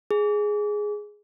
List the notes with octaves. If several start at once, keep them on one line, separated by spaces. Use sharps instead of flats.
G#4